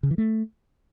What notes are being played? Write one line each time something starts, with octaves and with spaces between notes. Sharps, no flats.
C#3
E3
A3